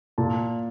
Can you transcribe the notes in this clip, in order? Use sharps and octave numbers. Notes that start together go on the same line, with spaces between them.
A#2 A5